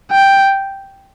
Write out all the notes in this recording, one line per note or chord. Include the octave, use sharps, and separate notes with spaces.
G5